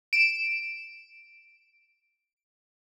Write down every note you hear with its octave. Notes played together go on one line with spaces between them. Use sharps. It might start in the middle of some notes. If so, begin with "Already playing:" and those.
D7 E7